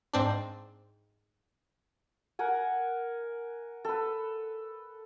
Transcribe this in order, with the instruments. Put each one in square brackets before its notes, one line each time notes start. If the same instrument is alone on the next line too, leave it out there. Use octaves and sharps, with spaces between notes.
[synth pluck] G#2 C4 D4
[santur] A#4 F#5 G#5
A4 B4